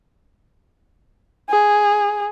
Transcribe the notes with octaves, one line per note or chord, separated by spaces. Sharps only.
G#4